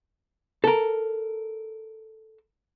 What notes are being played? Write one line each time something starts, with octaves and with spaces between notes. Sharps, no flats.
A4 A#4